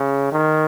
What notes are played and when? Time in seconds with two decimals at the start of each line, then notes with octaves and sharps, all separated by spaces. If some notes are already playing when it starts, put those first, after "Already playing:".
Already playing: C#3
0.32 D#3